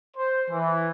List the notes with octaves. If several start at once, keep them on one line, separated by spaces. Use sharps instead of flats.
C5
E3